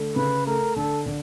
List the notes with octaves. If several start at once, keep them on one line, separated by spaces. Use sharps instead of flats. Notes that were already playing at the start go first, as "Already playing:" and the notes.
Already playing: D3 A3
C#3 B4
A3 A#4
D3 A4
D3